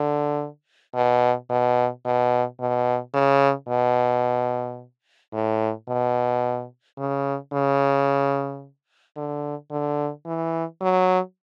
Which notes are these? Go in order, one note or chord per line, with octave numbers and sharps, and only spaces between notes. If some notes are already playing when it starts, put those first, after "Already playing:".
Already playing: D3
B2
B2
B2
B2
C#3
B2
A2
B2
C#3
C#3
D3
D3
E3
F#3